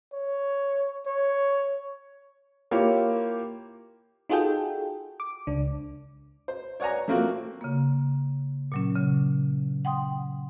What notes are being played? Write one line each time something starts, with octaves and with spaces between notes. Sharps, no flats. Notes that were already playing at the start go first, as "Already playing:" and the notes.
C#5
C#5
A#3 E4 F4 G4 C#5
D#4 F4 F#4 G#4 A4 G5
D6
C#2 D4
C5
C#5 D5 F#5 G#5 A#5
F3 A3 A#3 C4 F4 F#4
C#3 A#3
A#2 F#3 C#4
C#3
F#5 G5 C6 D#6